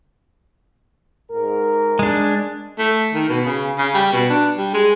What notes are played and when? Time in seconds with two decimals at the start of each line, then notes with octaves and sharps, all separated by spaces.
1.31 G#2 A#4
1.99 G#3 D4
2.78 A3
3.14 D#3
3.29 B2
3.45 C#3
3.78 C#3
3.94 G3
4.13 B2
4.30 D4
4.57 G3
4.74 G#3